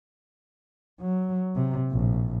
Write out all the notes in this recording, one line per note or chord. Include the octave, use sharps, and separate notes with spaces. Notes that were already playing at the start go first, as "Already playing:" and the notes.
F#3
C3
A#1 A2